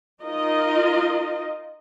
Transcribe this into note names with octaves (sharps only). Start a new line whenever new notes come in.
D#4 F4 A#4 D#5